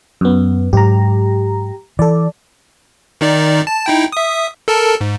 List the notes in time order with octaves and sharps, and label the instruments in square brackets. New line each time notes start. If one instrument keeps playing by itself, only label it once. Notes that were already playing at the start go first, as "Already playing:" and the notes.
[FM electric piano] F#2 B3
[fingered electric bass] G#2 F#3 [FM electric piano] G4 A#5
[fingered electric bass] E3 [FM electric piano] A4 D5
[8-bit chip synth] D#3 D#4 D5
A5
D#4 E4 G5
E5 D#6
A4 A#4 A5
G#2